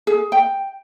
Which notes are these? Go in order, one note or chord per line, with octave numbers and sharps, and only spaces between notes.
G#4
G5